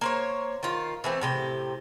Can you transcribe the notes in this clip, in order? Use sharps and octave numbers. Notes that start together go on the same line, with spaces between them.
A#3 C5 C#5
D#3 F4
E3 A3 C4
A2 C3 G4